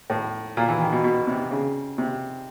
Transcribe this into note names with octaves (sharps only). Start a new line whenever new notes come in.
A2
A#2
E3
D#3
B2
B2
C3
C#3
C3